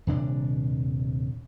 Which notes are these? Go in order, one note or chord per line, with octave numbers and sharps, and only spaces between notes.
D#1 C3 D4